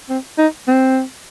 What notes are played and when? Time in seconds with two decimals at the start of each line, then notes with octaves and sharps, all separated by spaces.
0.09 C4
0.38 D#4
0.68 C4